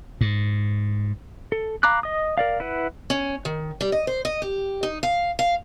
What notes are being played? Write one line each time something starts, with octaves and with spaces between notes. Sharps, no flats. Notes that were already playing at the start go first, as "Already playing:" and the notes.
G#2
A4
F5 A#5 B5 D6 F#6
D#5 D#6
A#4 D5 F5
E4 B4 F#5
C#4
D#3
G3
D#5
C5
D#5
G4
D#4
F5
F5